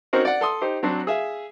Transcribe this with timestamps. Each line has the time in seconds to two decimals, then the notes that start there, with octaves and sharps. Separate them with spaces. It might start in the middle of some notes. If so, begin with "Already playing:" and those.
0.13 C4 C#4 D#4 F#4 A#4 C5
0.25 D5 F#5
0.41 A4 C6 D#6
0.62 D#4 G4 C5
0.83 F#3 C4 D4 F#4 C5
1.07 G#4 E5 F5